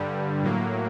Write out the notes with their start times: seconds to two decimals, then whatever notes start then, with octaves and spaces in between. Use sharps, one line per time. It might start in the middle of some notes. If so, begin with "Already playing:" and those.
Already playing: G2 D3 G3
0.43 A2 F#3 A#3